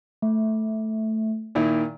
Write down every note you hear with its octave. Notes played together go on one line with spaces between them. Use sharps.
A3
A#2 D#3 E4